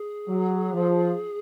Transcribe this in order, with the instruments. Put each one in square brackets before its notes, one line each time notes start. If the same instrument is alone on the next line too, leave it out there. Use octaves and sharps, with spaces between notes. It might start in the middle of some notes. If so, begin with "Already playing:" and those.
Already playing: [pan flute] G#4
[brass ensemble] F#3
F3